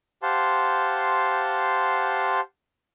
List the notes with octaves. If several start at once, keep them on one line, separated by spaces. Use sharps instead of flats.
G4 C5 F5 F#5 A5 C6